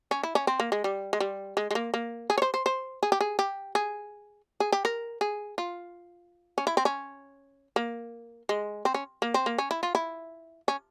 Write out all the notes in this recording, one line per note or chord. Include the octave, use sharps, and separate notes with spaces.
C#4
E4
C#4
C4
A#3
G#3
G3
G#3
G3
G#3
G#3
A#3
A#3
G#4
C#5
C5
C5
C5
G#4
G4
G#4
G4
G#4
G#4
G4
A#4
G#4
F4
C#4
E4
C4
C#4
A#3
G#3
C4
C#4
A#3
C4
A#3
C#4
E4
F4
E4
C#4